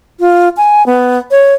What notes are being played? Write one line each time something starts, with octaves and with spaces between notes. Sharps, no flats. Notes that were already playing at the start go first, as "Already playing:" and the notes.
F4
G#5
B3
C#5